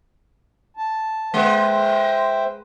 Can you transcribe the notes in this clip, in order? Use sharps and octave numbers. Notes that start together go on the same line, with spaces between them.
A5
G#3 B4 C5 E5 G5